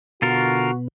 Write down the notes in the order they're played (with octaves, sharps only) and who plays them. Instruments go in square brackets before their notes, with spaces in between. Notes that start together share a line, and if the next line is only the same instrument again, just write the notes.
[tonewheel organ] B2 B3 [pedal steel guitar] D3 F4 A#4 [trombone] F#4